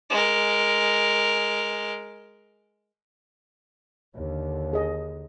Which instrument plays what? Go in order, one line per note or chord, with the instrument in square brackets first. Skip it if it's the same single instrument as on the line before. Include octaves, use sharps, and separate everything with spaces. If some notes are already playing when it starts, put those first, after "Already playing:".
[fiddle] G#3 A#4
[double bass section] D#2 D3
[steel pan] G#4 D#5